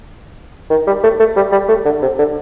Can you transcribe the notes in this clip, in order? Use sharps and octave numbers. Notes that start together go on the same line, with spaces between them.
D#3
G3
A3
A3
G3
G3
A3
D3
C3
D3